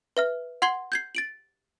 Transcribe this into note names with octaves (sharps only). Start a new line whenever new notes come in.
B4 E5 F6
F#5 C6 G#6 C7 G7
G6 G#6 C7
A6 D7 F#7